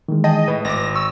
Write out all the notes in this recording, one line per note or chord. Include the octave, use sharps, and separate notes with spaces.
D#3 E3 G#3
G#4 D#5 G5 A5
A2 B4
G#1 D6 A#6
C#6 E6